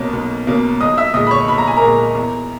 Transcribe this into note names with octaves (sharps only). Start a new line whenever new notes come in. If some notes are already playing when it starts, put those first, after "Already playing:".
Already playing: B1 B2 A#3 C#4
B1
B2 A#3 C#4
B1 D#5 D#6
E5 E6
A#2 G#3 D#5 D#6
B5
C#5 C#6
B1 B5
A#5
G#5
A#4 A#5
A#2 G#3
E2